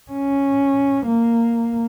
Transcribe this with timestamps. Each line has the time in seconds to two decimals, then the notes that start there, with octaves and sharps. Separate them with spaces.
0.11 C#4
1.06 A#3